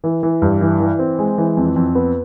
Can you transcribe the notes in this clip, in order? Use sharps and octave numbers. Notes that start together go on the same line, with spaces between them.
E3
E3
G2
E3
E3
C4
G#3
E3
F2
F2
B3